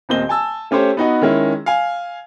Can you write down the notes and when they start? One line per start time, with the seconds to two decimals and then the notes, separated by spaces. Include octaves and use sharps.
0.09 D#1 A#2 C4 D#5 G7
0.29 G#5 A5 E6
0.71 A3 C#4 G4 C5 C#5
0.97 B3 D#4 F#4
1.22 D#3 G#3 C#4 E4
1.66 F5 G#5